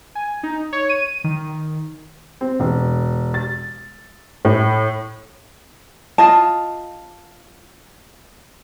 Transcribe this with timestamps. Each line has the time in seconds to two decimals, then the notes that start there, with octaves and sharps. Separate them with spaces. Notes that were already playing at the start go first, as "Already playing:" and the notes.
0.15 G#5
0.43 D#4
0.73 C#5
0.89 D#7
1.24 D#3
2.41 C4
2.60 E1
3.34 A6
4.45 A2
6.18 F4 D#5 A5